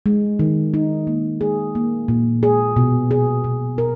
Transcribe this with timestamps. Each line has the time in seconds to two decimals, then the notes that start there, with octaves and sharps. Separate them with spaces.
0.06 G#3
0.39 D#3
0.74 D#4
1.07 A#3
1.41 G#4
1.75 A#3
2.08 A#2
2.43 G#4
2.76 B2
3.11 G#4
3.44 B2
3.78 A#4